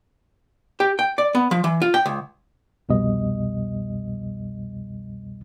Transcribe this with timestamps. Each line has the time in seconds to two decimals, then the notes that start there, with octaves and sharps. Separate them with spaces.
0.80 G4
0.99 G5
1.18 D5
1.35 B3
1.51 F3
1.64 E3
1.82 F4
1.94 G5
2.06 C#2
2.89 C2 F2 B2 G3 D#5